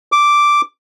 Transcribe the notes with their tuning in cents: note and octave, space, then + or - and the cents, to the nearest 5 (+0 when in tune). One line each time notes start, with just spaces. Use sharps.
D6 +0